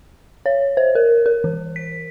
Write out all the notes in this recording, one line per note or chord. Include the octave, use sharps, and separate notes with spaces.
C#5
C5
A#4
A#4
E3
B6